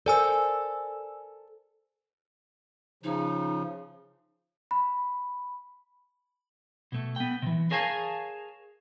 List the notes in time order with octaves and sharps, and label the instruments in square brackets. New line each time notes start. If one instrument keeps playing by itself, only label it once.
[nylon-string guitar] A4 A#4 C5 [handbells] D5 G#5 E6
[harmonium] C#3 F3 [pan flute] D#4
[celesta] B5
[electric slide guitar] B2 A3
B3 G5
C3 E3
G#4 A#4 C#5 F5 G#5 A5